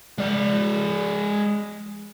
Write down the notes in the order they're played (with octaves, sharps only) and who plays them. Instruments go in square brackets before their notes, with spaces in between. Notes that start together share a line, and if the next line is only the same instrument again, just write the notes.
[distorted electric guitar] G#3 D5